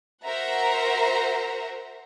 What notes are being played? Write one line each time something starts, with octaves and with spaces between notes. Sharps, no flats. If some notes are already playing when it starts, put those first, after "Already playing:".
F#4 A#4 C5 E5 F#5 A#5